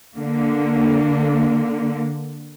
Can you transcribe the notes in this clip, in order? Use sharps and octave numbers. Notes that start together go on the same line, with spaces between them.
D3 A#3